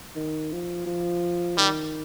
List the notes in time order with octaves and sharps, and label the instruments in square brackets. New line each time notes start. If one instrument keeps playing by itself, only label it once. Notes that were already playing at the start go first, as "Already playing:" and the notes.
[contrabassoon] D#3
F3
F3
[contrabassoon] D#3 [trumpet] G3